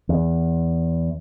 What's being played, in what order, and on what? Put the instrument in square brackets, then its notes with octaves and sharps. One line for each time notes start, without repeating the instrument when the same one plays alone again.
[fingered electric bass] E2